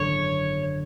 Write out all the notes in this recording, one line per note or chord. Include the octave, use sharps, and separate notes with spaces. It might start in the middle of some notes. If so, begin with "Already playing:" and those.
Already playing: G#1 F#2 D3 C#5